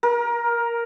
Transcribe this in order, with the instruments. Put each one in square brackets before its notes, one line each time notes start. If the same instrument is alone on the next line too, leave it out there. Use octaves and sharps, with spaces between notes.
[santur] A#4